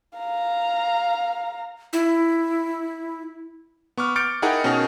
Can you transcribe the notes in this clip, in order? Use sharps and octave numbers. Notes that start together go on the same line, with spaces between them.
F5 A#5
E4
B3 C#6 D6 F6
D6 F6 G6 A6 C#7 D7
D#4 E4 G#4 A#4 F#5 G5
B2 C#4 D#4 G#4 A#4